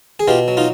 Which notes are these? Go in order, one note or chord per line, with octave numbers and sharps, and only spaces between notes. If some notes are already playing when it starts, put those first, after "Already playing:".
G#4
B2 F4 G4
F#3
D#4 F4